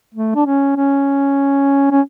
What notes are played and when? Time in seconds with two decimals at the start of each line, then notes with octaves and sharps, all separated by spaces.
0.15 A3
0.35 D4
0.46 C#4
0.77 C#4
1.91 C#4